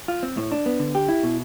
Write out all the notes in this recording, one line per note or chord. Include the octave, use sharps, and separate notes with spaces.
F4
C4
A2
D4
B3
D3
G4
E4
B2